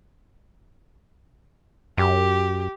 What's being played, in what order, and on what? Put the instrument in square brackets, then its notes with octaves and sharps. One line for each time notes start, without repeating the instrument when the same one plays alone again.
[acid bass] F#2 [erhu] G4